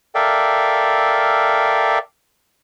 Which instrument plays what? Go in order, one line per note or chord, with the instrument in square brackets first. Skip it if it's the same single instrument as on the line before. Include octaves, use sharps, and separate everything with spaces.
[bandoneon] A4 A#4 D5 E5 F5 G5